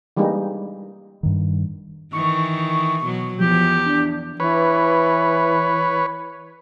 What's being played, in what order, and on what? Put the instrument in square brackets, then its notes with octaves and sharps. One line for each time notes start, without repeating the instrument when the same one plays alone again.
[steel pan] E3 G3 G#3 A#3 D#4
[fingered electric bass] G2 D#3
[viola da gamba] D#3 E3 [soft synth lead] C#6
[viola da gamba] B2 F#3
[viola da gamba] E2 [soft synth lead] F3 [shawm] G4
[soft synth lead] D4
[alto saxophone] E3 [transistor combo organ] B4 C#5